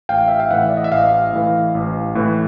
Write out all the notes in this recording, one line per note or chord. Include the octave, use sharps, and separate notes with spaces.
A1 F5 G5
E5
F5
A2 E3 E5 F#5
D5
D#5
E5
A1 D#5 F5
A2 E3
A1
A2 E3